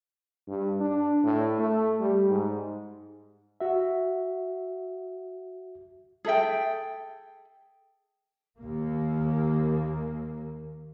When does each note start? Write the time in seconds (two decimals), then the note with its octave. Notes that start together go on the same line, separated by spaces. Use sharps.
0.48 G2
0.80 D4
1.24 A2
1.59 A3
2.00 G3
2.29 G#2
3.60 F#4 E5
6.25 G#4 A4 E5 G5
8.59 D#2 A#3